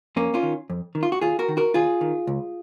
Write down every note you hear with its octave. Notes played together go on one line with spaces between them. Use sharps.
F2 A#3 C#4
C#4 F4
D#3
F2
D#3
F4
F#4
D#2 F4 G#4
F#4 A#4
D#3
F#4 A#4
D#2 F4 G#4
D#3
C#2